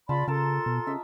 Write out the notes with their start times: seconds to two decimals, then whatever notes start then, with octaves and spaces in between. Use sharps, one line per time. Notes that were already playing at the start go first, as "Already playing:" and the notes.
0.09 C#3 F4 D5 A5 B5 C6
0.28 C#3 A4 A#4 A5 C6
0.66 B2
0.87 C#3 D#5 E5